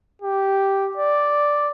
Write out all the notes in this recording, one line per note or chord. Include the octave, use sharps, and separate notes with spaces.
G4
D5